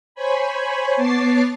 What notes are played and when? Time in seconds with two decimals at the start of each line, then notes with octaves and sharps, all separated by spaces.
0.15 C5 C#5 G#5 B5
0.96 B3 C#5 A5 D6 A6 C7